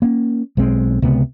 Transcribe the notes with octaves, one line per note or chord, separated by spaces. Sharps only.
A#3 C#4
B1 G#3 C4
C#2 C3 B3